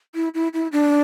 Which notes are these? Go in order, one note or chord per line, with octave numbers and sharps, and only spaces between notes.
E4
E4
E4
D4